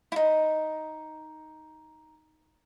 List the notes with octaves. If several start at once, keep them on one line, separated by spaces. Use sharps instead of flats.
D#4 E4